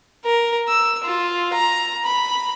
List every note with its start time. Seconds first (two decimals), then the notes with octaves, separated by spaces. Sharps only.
0.25 A#4
0.69 E6
1.04 F4
1.53 A#5
2.05 B5